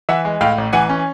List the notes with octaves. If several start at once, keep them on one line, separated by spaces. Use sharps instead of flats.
E3 E5 F#5
G#3
A2 F5 G5
A1
E3 F#5 G#5
C#4